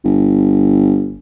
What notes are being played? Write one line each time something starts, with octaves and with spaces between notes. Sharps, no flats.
G1